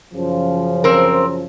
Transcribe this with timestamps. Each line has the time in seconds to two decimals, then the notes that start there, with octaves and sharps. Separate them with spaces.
0.14 F#2 C#3 F3
0.84 C4 A#4